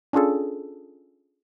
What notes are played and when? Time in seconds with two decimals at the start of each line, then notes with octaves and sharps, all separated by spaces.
0.13 C#4 D4 F4 G#4 A4